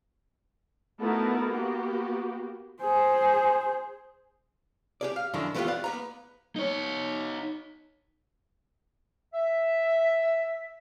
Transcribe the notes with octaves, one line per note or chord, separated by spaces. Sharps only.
A3 B3 D#4 E4 F#4 A#4
A#3 B3 F#4 G4
G#4 C5
G4 G#4 D5
F5
F#2 D3 D#3 F#3 D4 E4
E3 A3 B3 D#4 F4 G4
D5 F5 F#5
A#3 B3 A#5
D#4 C#5
E5